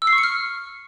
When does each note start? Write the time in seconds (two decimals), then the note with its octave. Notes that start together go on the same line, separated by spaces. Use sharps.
0.02 E6
0.07 C7
0.13 C#6
0.18 C#7
0.23 F6